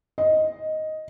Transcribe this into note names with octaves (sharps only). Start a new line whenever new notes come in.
D#5